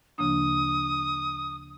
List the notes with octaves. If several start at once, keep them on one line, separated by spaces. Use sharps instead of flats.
D2 C#3 F3 A#3 D4 D#6